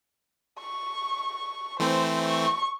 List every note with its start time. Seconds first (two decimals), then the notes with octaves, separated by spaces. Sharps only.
0.59 C#6
1.80 E3 A3 C4 C5
2.26 C#6